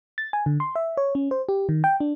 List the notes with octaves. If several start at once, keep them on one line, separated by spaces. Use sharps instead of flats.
A6
G#5
D3
C6
E5
C#5
C#4
C5
G4
D#3
G5
D4